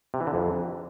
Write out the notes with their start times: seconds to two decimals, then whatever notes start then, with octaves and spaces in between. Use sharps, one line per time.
0.14 C3
0.20 E3
0.27 D3
0.34 F2